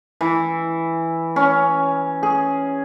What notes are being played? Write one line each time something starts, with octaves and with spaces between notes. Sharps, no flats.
E3
C#4
G#4